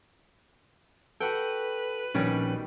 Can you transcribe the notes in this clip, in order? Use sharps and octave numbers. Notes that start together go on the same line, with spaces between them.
F#4 A4 B4 F#5 G5
A#1 B2 D#3 G3 C#4